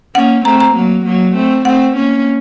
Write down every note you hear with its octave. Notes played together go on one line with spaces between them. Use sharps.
A#3 C#4 F#5
A3 C4 A#5
A#5
F#3 A#3
F#3 A#3
A3 C4
A3 C4 F#5
A#3 C#4